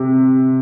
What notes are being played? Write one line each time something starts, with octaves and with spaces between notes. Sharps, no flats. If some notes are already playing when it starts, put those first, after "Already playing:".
Already playing: C3